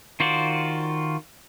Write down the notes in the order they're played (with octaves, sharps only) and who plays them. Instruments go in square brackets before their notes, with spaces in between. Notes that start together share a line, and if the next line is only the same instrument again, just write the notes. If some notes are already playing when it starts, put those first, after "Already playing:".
[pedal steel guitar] D#3 F4 F#4 C5 D5